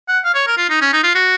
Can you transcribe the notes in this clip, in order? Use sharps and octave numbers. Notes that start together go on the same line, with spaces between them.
F#5
F5
C#5
A#4
F4
D#4
C#4
D#4
F4
F#4